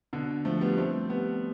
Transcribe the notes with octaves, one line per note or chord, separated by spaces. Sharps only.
B2 D3
F3 A3
G3 B3
A3 C4
G3 B3